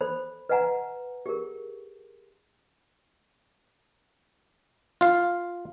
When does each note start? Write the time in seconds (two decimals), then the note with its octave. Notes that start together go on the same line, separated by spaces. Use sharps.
0.01 A4 C5 B5
0.49 B4 D#5 F5 F#5 G#5 A#5
1.26 G4 G#4 A#4
5.01 F4 F5